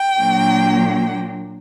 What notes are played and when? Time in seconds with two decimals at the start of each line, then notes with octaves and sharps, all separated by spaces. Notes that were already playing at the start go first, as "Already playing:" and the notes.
Already playing: G5
0.17 A#2 F#3 A#3 D4